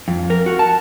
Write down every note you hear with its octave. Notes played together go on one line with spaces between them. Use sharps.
F2
A#4
F#4
A5